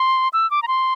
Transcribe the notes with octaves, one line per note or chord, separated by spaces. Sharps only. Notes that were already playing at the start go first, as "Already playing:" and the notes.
Already playing: C6
E6
D6
A#5
C6